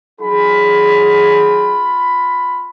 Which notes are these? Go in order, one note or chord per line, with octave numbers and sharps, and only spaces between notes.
F#3 D#4 F4 G#4 B5